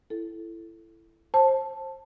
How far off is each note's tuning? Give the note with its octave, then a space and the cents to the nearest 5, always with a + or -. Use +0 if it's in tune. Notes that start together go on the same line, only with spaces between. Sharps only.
E4 +20 A4 +0
C5 +25 A5 +0